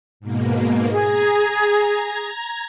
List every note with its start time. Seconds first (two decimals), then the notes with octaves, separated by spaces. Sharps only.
0.20 G#2 B2 A#3
0.92 G#4 A#5 G#6